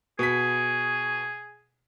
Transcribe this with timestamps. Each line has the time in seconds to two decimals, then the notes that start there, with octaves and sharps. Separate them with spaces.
0.19 B2 G#4 B6